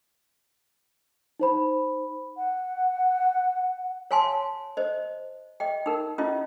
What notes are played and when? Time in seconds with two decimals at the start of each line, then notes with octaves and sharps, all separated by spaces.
1.40 D#4 C5 B5
2.36 F#5
4.11 C#5 F5 G#5 A5 C6
4.77 C5 D#5
5.60 D#5 G5
5.86 D#4 A#4
6.18 C#4 E4 F4 D#5